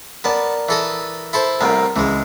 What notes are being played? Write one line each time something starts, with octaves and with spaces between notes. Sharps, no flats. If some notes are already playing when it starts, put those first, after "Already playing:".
B3 A#4 D5 A5
E3 A4 D#5
E4 A4 C5
C2 A2 B3 A#4 C5 A#5
C#2 E3 G#3